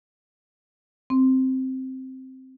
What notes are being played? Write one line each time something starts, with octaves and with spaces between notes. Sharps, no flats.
C4